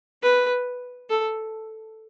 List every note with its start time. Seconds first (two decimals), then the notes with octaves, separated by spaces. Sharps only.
0.22 B4
1.10 A4